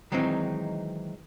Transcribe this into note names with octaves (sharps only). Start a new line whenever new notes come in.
D#3 E3 F#3 G#3 C4 D#4